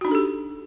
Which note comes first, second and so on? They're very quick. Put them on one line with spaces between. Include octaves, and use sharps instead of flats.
F#4 D#4 D4 A4 G4